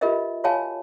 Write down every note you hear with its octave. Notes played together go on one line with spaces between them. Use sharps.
F4 G4 A#4 B4 D#5 E5
F4 F#4 C#5 F5 G#5 A5